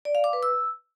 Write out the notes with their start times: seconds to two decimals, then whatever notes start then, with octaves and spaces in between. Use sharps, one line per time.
0.05 D5
0.15 F5
0.24 D6
0.33 B4
0.43 E6